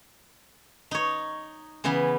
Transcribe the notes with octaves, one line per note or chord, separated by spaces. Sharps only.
D#4 C#5
C#3 E3 B3 G#5